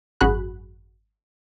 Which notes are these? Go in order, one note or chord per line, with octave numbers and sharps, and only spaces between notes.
G#1 F#2 F#4 G#4 B5 F#6